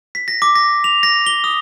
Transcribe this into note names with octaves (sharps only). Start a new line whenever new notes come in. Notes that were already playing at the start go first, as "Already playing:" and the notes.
B6
A#6
D6
A#6
F7
A#6
G7
D#6